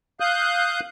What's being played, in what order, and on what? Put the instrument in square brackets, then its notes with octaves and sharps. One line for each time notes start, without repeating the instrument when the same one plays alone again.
[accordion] F5 D#6 F#6 G6